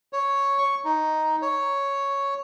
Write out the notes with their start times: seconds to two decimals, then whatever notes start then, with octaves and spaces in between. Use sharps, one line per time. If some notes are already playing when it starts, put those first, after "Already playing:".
0.13 C#5
0.58 C#6
0.84 D#4
1.42 C#5